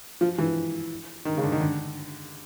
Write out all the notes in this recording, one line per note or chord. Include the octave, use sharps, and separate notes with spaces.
F3
E3
D#3
C#3
D3
D#3
D3